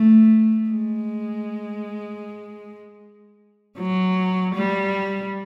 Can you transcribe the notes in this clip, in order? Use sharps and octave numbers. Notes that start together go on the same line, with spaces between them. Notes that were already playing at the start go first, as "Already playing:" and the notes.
Already playing: A3
G#3
F#3
G3